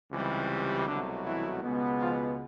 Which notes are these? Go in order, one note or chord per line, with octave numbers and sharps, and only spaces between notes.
C#2 C3 E3 G3
C2 B2 D3 F#3 A3 D4
E3 E4
C#2 B2 G#3 B3
F3 F4